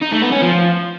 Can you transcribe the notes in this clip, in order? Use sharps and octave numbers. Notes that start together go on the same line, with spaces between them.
D#4
A3
B3
C#4
F3